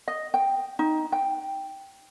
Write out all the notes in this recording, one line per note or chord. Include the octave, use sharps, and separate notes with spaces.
D#5
G5
D#4
G5